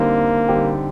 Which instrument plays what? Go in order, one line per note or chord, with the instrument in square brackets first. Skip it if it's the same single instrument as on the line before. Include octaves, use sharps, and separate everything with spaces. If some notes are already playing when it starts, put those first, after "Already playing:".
Already playing: [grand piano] D3 G3 C4 D#4 G4 [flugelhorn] A#3
[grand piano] D3 G3 C4 D#4 G4